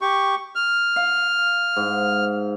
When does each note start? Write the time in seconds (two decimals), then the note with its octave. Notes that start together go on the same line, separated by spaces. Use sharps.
0.01 G4 C#6
0.55 F6
0.96 F5
1.76 G#2